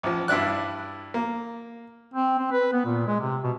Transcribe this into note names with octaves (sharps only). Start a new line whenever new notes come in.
A1 F3
G2 D4 E4 D5 F#6
A#3
C4
C4
B4
B3
A#2
G#3
C3
B2